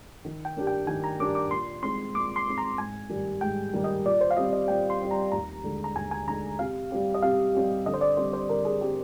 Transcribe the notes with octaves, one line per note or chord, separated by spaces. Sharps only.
D#3
G5
A#3 D4 G4
G5
D#3 G#5
A#5
A#3 D4 G4 D6
D6
A#2 C6
G#3 C4 D#4 C6
A#2 D6
C6
G#3 C4 D#4
A#5
G#2 G#5
D#3 G3 A#3
G#2 G5
D#3 G3 A#3
D#5
A#2 D5
C5
F5
G3 C4 D#5
D#5
A#2 G5
C6
G3 C4
A#5
D#2 A#5
D3 G#3 D#4
A#5
D#2 G#5
G#5
D3 G#3 D#4 A#5
C3 F5
G3 C4 G4
D#5
C3 F5
G3 C4 G4
D3 D#5
C5
D5
G3 C4 C5
C5
D3 A#4
G#4
G3 C4 G4